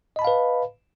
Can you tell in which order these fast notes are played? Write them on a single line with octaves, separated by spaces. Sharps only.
D#5 B5 A5 F5 B4